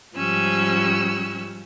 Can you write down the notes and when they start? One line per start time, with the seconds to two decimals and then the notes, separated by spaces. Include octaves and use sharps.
0.14 G#2 F3 G3 C#4 E6 F#6